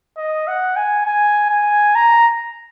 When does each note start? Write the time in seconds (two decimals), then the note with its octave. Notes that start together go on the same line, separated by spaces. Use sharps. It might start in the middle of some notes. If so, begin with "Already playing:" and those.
0.18 D#5
0.48 F#5
0.77 G#5
1.06 G#5
1.50 G#5
1.95 A#5